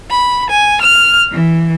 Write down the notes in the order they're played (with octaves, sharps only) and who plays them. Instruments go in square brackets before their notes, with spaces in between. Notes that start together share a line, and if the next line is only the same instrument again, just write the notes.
[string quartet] B5
G#5
F6
E3